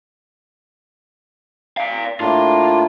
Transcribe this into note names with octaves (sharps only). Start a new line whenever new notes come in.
D5 F5
A2 A#3 D4 F4